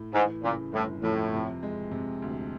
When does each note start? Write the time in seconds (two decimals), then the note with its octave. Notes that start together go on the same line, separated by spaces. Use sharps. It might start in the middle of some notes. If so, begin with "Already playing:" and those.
Already playing: A2
0.13 G#2 E3
0.43 A#2 C#3
0.73 G1 A2
1.03 F2 A2
1.33 C3
1.63 G#3
1.91 C3
2.22 D2